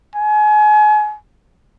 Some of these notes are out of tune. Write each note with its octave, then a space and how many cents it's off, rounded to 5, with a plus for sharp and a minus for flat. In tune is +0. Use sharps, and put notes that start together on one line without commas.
G#5 +35